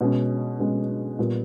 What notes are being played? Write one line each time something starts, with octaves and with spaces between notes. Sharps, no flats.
B2 G#3 C#4
B2 G#3 C#4
A#2 G3 B3